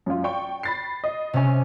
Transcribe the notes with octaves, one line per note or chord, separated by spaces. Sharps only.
F#2 F4
D5 G5 C#6
B5 A6 C7
D#5
C2 C3 C#4 G#5